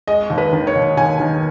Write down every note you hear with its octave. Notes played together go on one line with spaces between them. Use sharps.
G#3 D#5
D#2
B4
D#3
C#5
D#2
D#2 G#5
D#3